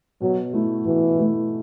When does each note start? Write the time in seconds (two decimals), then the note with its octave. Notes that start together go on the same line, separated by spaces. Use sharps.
0.21 B2 F#3
0.53 A3 E4
0.85 B2 E3
1.18 A3 E4